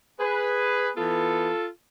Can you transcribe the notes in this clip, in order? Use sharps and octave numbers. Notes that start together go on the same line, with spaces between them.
G#4 B4
E3 B3 F4 A4